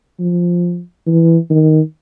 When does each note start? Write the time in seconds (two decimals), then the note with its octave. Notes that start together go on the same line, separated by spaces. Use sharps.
0.19 F3
1.06 E3
1.50 D#3